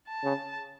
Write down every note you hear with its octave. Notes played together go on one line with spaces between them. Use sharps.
A5
C#3